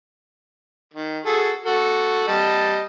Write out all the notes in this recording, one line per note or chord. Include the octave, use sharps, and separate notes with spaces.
D#3
F#4 G#4 A4
F#4 A4
G3 D#5 A5